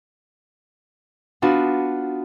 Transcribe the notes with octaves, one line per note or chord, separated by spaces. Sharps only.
B3 D4 F4 F#4